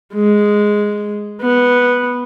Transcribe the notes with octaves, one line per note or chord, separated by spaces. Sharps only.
G#3
B3